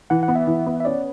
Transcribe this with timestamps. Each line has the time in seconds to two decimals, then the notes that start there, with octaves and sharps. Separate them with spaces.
0.10 E3 F#5
0.23 F#5
0.28 B3
0.35 E5
0.47 E3
0.66 B3
0.80 E5
0.85 C#4 D5